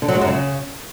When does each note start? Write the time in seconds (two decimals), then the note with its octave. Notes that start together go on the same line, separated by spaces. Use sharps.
0.02 D3
0.08 F#3
0.15 G#3
0.21 F#2
0.28 C#3